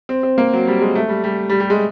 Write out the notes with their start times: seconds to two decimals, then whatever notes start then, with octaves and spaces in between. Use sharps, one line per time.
0.09 C4
0.23 C4
0.38 A#3
0.53 F#3
0.67 G3
0.81 G#3
0.95 A3
1.09 G3
1.24 G3
1.49 G3
1.60 G3
1.70 G#3